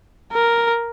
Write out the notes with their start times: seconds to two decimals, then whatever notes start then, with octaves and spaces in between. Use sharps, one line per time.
0.32 A#4